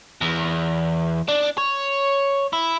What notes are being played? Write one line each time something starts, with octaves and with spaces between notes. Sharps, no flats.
E2
D4
C#5
E4